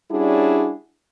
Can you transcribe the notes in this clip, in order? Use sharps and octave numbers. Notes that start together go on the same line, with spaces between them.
G3 C#4 D4 E4 F#4 G#4